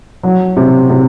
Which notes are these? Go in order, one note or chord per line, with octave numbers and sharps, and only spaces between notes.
F#3
C3
C3